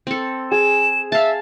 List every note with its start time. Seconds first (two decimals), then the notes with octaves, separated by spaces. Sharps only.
0.07 C4 A4
0.51 G#4 E7
1.12 E5 F5 A5